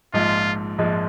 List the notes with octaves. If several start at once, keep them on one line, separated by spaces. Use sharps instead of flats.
A#1 G#2 F3 G#3 F4
A#1 G#2 F3 G#3